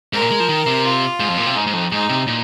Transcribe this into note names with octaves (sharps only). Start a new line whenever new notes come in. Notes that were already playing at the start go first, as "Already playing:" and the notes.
G#2 A#4
A#2
G#3
F3
D#3
C3
F4
G#2
F2
A#2
C3
G#2 D#4
G#2
F2
G#2 D#4
C3
A#2